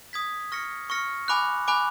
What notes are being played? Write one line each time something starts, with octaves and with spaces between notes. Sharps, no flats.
D#6 G#6 B6
C#6 F6 A#6 C#7
C#6 F6 A#6 C#7
G#5 B5 D6 F#6
G#5 B5 D6 F#6